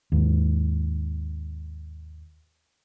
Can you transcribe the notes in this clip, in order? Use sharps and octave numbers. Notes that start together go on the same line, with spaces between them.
D#2 G#2